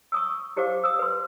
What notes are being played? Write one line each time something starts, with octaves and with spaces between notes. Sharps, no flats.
C#6 D#6 E6
E4 G4 C5 F5 D6
D#6 E6
B4 C6